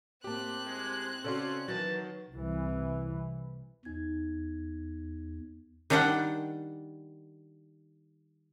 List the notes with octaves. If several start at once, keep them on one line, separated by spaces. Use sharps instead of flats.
A2 A#3 C4 G4 A5 F#6
G#3
C#3 C#4 F#4 A4 D5 C6
D#3 E3 F#3 B4 A5
C2 E3
E2 D#4 G#6
D#3 G3 D4 D5 F#5 G5